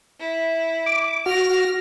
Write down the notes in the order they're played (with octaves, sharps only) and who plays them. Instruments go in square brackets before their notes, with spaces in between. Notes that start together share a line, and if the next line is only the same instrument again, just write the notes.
[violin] E4
[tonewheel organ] D6
[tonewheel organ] F#4 [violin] F6 A#6